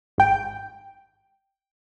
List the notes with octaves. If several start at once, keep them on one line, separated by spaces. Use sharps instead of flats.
G#1 G5